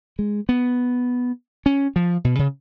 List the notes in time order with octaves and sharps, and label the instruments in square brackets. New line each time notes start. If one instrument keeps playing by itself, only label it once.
[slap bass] G#3
B3
C#4
F3
B2
C#3